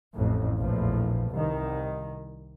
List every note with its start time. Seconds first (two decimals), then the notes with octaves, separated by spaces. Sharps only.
0.13 A1 F2 A2
0.57 A#1 E2 A2 F3
1.30 C2 D#3